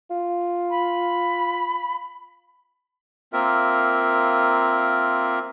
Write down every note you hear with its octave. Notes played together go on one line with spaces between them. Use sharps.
F4
B5
A#3 C4 F4 A#4 E5